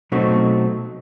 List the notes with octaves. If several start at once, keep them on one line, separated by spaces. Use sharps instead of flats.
B2 F#3 A3 C4 D#4 F#4